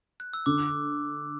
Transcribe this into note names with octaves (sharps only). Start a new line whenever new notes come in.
F#6
E6
D3 D6